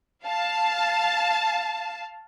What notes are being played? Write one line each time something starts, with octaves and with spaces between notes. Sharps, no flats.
F5 A5